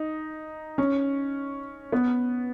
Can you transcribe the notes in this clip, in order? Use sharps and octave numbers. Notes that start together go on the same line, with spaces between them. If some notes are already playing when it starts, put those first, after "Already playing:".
Already playing: D#4
C#4
B3